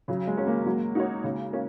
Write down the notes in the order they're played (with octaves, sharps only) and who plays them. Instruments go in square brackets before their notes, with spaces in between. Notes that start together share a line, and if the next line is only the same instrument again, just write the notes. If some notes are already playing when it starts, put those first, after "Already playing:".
[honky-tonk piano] C#3 [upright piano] F#3
[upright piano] G#3
[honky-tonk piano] F#3 C#4
[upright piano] A#3
[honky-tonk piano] F#3
D#4 F#4 C#5
C#3
A#3 C#4